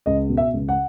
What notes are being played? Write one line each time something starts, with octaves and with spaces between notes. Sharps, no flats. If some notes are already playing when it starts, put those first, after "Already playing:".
C#2 D#5
B2
E5
C#2
F#5